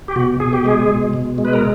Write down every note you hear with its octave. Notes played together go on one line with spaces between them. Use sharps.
G4
B2 F#4
B2 G#4
G4
G#3 G#4
B2
B2
G#3
B4
A#4